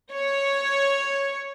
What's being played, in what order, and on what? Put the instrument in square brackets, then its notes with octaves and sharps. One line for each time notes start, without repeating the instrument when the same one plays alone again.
[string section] C#5